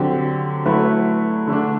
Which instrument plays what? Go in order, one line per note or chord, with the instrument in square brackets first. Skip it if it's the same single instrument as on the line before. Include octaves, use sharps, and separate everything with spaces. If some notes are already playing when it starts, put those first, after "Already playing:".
Already playing: [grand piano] D3 F#3 C4 G4
F#3 A3 E4 B4
D3 A3 D4